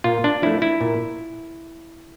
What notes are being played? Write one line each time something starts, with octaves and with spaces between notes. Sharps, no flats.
A#2 F4
D4
F3 A3 E4
E4
A#2